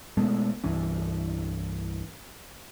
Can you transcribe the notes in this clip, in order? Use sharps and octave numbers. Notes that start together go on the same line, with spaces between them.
B2 G#3 A3 B3
C2 G2 E3 C#4